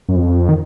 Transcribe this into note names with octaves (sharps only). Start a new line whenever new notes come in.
F#2
F2
D#3